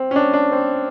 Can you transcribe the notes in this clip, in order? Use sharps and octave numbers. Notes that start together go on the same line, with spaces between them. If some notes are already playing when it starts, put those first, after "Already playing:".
Already playing: C4
C#4
D4
D4
C4